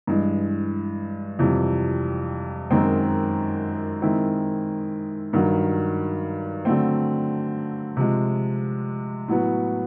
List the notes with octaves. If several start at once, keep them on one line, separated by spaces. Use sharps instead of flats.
G2 E3 G#3
F2 C3 E3 G3
F#2 D#3 G#3 C4
D#3 G#3 C4 E4
G2 D#3 F#3
D3 F#3 A3 C4
C3 F3 G#3
A2 F#3 B3